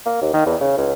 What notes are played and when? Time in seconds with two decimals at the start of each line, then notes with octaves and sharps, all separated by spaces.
0.06 A#3
0.22 D#2
0.33 D#3
0.46 E2
0.60 C#3
0.77 C#2